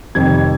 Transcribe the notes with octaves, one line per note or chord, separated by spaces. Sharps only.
F1 F2 D#3 G3 G#6